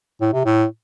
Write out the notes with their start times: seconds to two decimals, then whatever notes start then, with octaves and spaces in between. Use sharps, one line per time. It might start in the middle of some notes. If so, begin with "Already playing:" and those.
0.21 A2
0.33 C3
0.45 A2